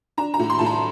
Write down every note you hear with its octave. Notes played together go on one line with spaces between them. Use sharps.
D4 A#5
A#5
A2
C6
A2 A5
A#5